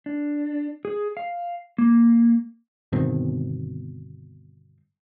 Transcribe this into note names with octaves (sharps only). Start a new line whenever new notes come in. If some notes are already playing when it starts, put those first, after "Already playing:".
D4
G#4
F5
A#3
G1 B2 D#3 C4